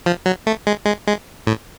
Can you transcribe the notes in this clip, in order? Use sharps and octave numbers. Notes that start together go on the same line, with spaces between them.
F3
F#3
A3
G#3
G#3
G#3
A2